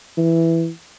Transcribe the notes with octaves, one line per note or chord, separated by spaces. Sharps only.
E3